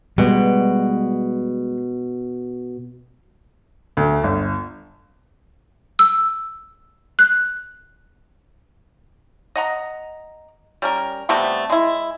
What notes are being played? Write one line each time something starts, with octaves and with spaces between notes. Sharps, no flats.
B2 G3 G#3
D2
G1
E6
F#6
D#5 F#5 A#5
G3 C#4 A#4
C3 G3 A3 B3
G#3 E4